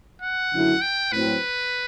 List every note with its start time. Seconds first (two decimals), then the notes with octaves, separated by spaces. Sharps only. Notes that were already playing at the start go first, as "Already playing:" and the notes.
0.22 F#5
0.52 F#2 D3 F#3 A3 E4
0.82 G5
1.12 A2 F#3 C4 B4